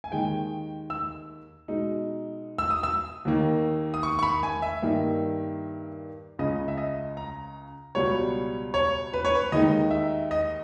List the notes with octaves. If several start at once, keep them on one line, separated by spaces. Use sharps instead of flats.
G#5
D#2 D#3 G#3 G5
E6
B2 G#3 D#4
E6
D#6
E6
D#2 D#3 A#3
D#6
C#6
C#6
B5
G#5
E5
G2 D#3 A#3
C#2 C#3 G#3 C#4 D#5
E5
D#5
A#5
C#2 B2 G3 B3 C#5
C#5
B4
C#5
B4
D#2 D#3 G#3 D#4 D#5
E5
D#5